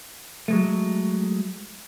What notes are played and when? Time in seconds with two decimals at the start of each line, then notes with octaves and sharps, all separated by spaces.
0.48 F#3 G#3 A3